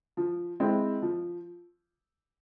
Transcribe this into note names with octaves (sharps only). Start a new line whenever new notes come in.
F3
G#3 C4 E4
F3